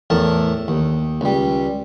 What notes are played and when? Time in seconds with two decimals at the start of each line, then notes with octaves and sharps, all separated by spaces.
0.10 E2 A2 A#4 A5
0.68 D#2
1.21 C#2 G3